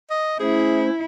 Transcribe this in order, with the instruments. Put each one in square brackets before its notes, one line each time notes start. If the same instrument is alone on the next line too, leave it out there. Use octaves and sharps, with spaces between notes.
[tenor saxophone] D#5
[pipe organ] A3 C#4 C5 [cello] E4 [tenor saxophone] G#4